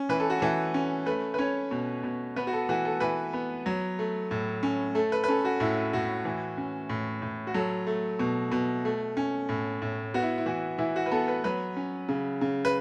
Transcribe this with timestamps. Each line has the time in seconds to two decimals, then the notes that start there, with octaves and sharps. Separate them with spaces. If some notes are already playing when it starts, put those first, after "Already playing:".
Already playing: C#4
0.09 E3 B4
0.20 A4
0.30 F#4
0.39 E3 A4
0.74 C#4
1.06 A3 B4
1.34 B4
1.38 C#4 C#5
1.71 B2
2.03 B2
2.36 B3 B4
2.47 F#4
2.53 A4
2.69 E3 F#4
2.85 A4
3.00 E3 B4
3.33 B3
3.66 F#3
3.99 A3
4.31 A2
4.63 C#4
4.95 A3 A4
5.12 B4
5.24 B4
5.28 C#4 A4
5.45 F#4
5.60 A2 E4
5.93 A2 F#4
6.25 E3
6.58 C#4
6.89 A2
7.22 A2
7.47 F#4
7.54 F#3 A4
7.87 A3
8.19 B2
8.51 B2
8.85 A3
9.17 C#4
9.49 A2
9.82 A2
10.14 B3 F#4
10.22 E4
10.38 E4
10.46 E3 F#4
10.78 E3 E4
10.96 F#4
11.06 B4
11.11 B3 A4
11.28 B4
11.44 F#3 B4
11.76 C#4
12.09 C#3
12.41 C#3
12.65 B4